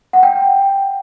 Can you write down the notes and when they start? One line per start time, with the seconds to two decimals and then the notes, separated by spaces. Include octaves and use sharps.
0.13 F#5
0.23 G5